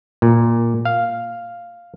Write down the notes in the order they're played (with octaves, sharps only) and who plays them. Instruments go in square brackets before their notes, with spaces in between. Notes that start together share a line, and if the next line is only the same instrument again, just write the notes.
[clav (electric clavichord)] A#2
F5